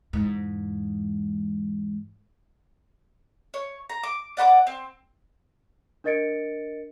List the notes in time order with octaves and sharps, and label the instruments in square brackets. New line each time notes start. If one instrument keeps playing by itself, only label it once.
[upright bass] E2 G#2
[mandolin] C#5
A#5
D6
D5 F#5 A#5 D6
C4
[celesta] D4 A#4 D#5 A6 C#7 D7